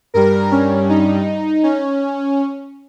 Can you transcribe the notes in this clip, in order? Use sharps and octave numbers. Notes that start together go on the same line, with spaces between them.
G2 G3 A#4
C#4
D#4
C#4